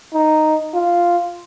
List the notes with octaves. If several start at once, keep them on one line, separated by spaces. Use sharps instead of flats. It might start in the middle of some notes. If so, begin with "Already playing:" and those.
D#4
F4